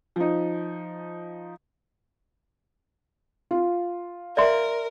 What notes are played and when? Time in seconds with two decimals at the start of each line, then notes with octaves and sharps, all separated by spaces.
0.16 F3 D#4
3.51 F4
4.37 A#4 D5 E5 C6